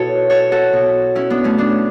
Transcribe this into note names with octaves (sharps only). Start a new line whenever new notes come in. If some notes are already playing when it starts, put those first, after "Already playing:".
Already playing: B2 E4 F#4 A4 B4 C#5
A4 C#5
F#4 A4
B2
C#4 E4
B3 D4
A3 C#4
B3 D4